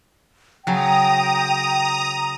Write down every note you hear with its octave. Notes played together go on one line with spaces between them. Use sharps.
C#3 F#3 G5 A#5 D#6